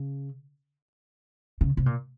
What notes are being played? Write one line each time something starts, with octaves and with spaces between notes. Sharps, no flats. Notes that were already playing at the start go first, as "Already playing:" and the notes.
Already playing: C#3
C#3
C3
A#2